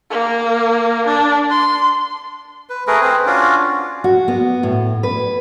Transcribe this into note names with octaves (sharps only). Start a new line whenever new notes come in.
A#3
D4
C6
B4
A3 G#4 A#4 B4
C4 G#4 B4 C5
C#4 D4 F4 F#4
F#4
B3
A2
B4